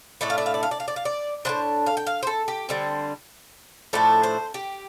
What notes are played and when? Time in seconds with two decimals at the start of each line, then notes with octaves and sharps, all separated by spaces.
0.21 A2 A3 D4 D5
0.30 F5
0.38 D5
0.46 F5
0.54 D5
0.63 F5
0.71 D5
0.80 F5
0.88 D5
0.96 F5
1.05 D5
1.45 A2 F3 D4 C5
1.86 F5
1.97 G5
2.07 F5
2.23 C5
2.27 A4
2.48 G4
2.69 D3 G3 C4
3.93 A2 F3 A3 D4 A4
4.23 C5
4.54 G4